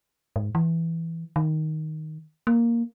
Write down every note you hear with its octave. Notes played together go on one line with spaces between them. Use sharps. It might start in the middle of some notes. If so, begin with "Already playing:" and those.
G#2
E3
D#3
A#3